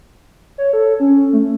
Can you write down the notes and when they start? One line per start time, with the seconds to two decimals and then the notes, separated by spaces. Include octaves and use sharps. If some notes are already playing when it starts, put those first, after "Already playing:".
0.58 C#5
0.73 A4
1.00 C#4
1.33 A3